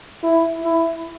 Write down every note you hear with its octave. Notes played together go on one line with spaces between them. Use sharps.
E4
E4